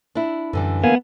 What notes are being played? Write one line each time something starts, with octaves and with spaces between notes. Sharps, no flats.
D4 E4
F#2 D3 E3 G3
A#3 B3 F5 G#5